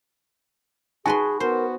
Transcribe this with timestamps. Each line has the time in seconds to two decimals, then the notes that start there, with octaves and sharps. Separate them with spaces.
1.06 D#4 F#4 G#4 B4 G#5 C6
1.40 B3 F#4 A#4 C5